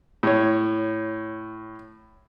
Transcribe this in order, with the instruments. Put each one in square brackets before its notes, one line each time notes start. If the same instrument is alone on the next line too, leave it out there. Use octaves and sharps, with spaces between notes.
[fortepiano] A2 C#5